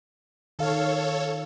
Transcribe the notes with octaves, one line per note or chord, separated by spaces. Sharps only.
D#3 A4 C#5 F5